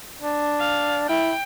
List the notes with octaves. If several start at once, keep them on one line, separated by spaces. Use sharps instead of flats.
D4
F5
E4 G5